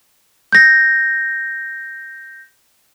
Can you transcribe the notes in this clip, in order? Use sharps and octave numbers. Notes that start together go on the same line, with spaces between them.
G6 A#6